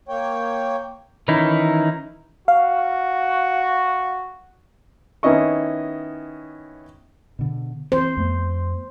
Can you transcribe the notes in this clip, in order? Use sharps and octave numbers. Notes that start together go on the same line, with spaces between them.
A#3 C#5 G5
D#3 E3 C#4 D#4 E4
F#4 F5
D#3 B3 C#4 E4 D#5 C#6
B2 D3
E3 C4 C5
F2 A3 B3